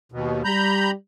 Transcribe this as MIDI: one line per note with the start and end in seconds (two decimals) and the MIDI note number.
0.12 0.43 39
0.12 0.43 47
0.45 0.91 55
0.45 0.91 82
0.45 0.91 83
0.45 0.91 91